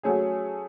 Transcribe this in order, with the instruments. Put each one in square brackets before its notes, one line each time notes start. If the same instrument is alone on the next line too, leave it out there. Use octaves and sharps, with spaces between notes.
[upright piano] F#3 A3 C#4 G#4